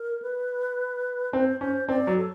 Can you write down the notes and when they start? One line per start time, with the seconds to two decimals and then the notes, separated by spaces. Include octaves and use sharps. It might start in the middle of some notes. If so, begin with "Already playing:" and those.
Already playing: A#4
0.22 B4
1.33 C4 C5
1.61 C#4 C5
1.88 C4 D5
2.07 F#3
2.17 A4